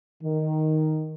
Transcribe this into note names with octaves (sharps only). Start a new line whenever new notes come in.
D#3